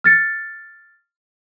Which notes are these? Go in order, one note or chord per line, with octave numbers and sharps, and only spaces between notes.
F6 A6 C#7